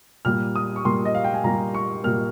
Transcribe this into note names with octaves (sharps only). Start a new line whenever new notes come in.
A#2 G3 A#3 F6
D#6
C#6
A#2 G3 A#3 C6
D#5
F5
G5
G#5
A#2 G3 A#3 A#5
C#6
A#2 G3 A#3 F6